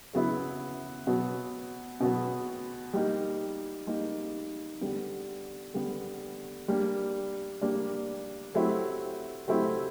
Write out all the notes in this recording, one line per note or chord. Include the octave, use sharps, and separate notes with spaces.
C#3 F#3 B3 E4
B2 F#3 B3
B2 F#3 B3
G3 A#3 D#4
G3 A#3 D#4
D3 G3 B3
D3 G3 B3
G3 A#3 D4
G3 A#3 D4
F#3 A3 C4 E4 G4
F#3 A3 C4 E4 G4